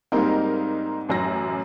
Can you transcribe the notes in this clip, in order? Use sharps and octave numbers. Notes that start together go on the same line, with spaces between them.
G#2 G3 A#3 C4 D#4 A#4
A1 F#2 A#6